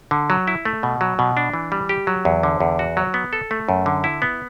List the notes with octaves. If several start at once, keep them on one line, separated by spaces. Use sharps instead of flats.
D3
F#3
E4
A3
B2
F#3
B2
D4
E3
G3
G4
F#3
E2
D3
E2
F#4
F#3
B3
A4
A3
F#2
D3
E4
B3